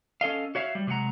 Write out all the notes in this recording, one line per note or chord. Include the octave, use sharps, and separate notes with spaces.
C#4 A4 D#5 F5
F#4 C#5 E5 F5
G3
C3 F#3 G#3 F#5 A#5